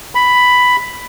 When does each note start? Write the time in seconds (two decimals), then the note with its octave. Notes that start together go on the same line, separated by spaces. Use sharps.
0.15 B5